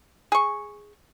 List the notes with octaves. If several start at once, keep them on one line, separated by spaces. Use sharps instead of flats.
G#4 C#6